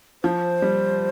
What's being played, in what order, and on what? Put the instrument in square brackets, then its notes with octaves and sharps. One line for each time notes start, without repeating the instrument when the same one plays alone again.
[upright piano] F3 [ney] C5
[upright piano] G3